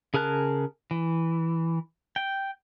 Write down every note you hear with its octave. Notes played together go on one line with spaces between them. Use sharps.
C#3 G#4 A#4 A5 F#6
E3
G5